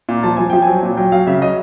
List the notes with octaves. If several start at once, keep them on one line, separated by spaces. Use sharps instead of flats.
A#2
F3 A5
F3 G#5
F3 G5
F#3 G#5
A#2
F#3 G5
F#3 F5
C#3 E5
F#3 D#5